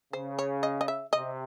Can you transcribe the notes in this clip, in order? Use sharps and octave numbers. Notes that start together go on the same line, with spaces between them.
C#3 C5
C#5
D#5
D#5
E5
C3 D#5